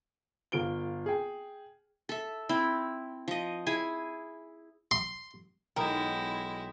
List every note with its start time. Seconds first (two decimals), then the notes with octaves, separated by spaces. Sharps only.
0.52 G1 F4 D7 G7
1.06 G#4 G5
2.09 A4 E5
2.49 C4 E4
3.28 F3 D#5
3.66 E4 G#4 G#5
4.91 C6
5.76 B1 G#3 E4 A#4 G5 D#6 G6